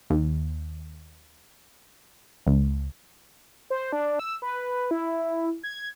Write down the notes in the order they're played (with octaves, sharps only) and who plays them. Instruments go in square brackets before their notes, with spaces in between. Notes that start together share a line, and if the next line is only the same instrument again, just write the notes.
[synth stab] D#2
C#2
[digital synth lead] C5
D4
E6
B4
E4
G#6